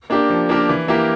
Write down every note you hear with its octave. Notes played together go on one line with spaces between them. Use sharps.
A#3 D4 G4 A#4
F3
A#3 D4 G4 A#4
E3
A#3 E4 G4 A#4